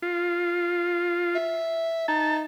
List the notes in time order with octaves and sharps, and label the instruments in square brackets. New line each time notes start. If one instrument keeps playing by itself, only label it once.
[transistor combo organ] F4
[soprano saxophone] E5
[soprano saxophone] D#4 [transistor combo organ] A5